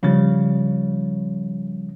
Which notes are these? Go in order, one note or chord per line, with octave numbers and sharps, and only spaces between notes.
C#3 F3 G3 A6